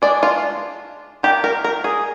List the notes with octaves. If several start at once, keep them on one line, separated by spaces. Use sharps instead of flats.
G#3 D4 D5
F4
D#3 A#3 D4 G4
A#4
A#4
G#4